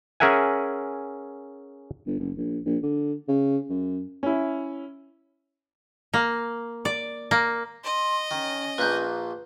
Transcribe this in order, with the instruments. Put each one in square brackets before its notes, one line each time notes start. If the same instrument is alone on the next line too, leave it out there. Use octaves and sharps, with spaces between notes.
[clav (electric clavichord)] C#4 G#4 A#4 E5 F#5 G#5
[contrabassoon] G1
F#1
A#1
A#1
D3
C#3
F#2
[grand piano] C#4 E4
[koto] A#3
D5
A#3
[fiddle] D#5 [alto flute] C6
[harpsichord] D#3 [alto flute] C#4
[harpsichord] A#1 A#2 [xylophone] B4 F#6 G6